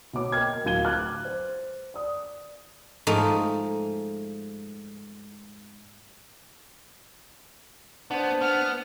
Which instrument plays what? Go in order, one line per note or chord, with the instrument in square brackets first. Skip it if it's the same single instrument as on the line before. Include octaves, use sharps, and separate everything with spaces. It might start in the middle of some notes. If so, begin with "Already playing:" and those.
[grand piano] B2 A#3 C#5 D6
A#4 D#5 G5 F6 G#6
D1 F4 F5 G#6 D#7 G7
D6 F6 F#6 G#6 A6
C5
D5 D#6
[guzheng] G#2 F3 A3 D#4
[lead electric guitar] B3 [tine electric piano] D4 C5
[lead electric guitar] B3 [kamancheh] F6